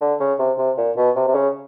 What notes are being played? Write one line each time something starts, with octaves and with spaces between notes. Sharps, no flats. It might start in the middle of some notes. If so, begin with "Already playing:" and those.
D3
C#3
C3
C3
A#2
B2
C3
C3
C#3